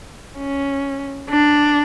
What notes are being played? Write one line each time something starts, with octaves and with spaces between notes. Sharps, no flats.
C#4
D4